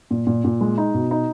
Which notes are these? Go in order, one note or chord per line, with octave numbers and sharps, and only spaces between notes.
A#2
A#2
A#2
G#3
D#4
B2
D#4